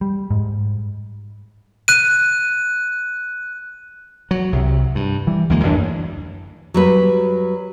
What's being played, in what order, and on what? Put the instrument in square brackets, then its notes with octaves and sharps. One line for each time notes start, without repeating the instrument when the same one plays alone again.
[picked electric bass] G3
G#2
[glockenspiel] F#6 D#7
[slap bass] F#3
C2 C3
G2
E3 G3
D2 E3 G#3 A#3
A1 F#2 E3 D4
[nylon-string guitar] F#3 G3 B4